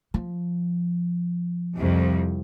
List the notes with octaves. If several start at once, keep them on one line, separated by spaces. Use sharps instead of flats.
F3
C2 F2